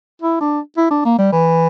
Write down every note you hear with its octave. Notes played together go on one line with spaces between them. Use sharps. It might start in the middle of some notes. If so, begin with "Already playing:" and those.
E4
D4
E4
D4
A#3
G3
E3